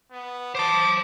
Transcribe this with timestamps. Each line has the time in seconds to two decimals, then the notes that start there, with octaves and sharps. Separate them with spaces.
0.11 B3
0.55 C5 A5 D6